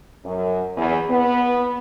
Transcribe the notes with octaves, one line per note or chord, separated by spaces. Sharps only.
F#2
E2
B3